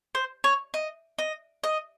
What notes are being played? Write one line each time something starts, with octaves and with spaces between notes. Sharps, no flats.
C5
C#5
D#5
D#5
D#5